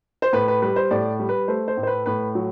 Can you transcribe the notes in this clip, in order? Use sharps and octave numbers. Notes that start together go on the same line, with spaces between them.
C5
A2 B4
B4
G3 B4
C5
A2 D5
G3
B4
A3 C5
C5
A2
C5
B4
A2 B4
F#3